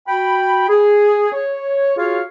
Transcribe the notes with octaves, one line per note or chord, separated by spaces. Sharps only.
F#4 G5 B5
G#4
C#5
F4 F#4 G#4 C#5 F5